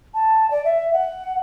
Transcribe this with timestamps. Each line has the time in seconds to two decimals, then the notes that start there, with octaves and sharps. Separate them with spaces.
0.14 A5
0.50 D5
0.64 E5
0.93 F#5